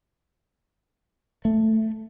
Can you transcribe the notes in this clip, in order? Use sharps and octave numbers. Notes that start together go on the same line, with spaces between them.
A3